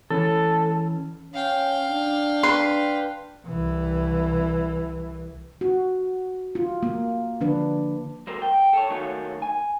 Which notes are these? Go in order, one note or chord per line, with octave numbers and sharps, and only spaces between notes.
E3 C#4 A4
C#4 F5 G5
D4
B4 C6
C2 E3
F#4
F4
A#3
D3 F3 D4 B4
F#3 A#3 A4 A#4 C5
G5
A4 C#5
D#3 F#3 A3 A#3 C#4 F#4
G#5